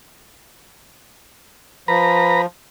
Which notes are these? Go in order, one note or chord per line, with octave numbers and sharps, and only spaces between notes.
F3 B4 A#5